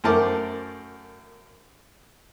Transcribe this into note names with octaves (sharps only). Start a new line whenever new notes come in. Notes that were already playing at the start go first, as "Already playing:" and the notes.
F#2 A3 A#4 C5 A5 D6